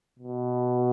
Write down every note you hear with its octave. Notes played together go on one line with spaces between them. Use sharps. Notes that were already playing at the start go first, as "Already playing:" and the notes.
B2